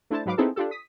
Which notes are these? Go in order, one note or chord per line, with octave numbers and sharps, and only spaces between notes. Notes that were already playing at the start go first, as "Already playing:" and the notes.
A3 D4 E4 C5 A5
G#2 F#3 B4 F5 D6
B3 C4 D#4 E4 G#4 A4
D4 F4 G4 A4
D#6 B6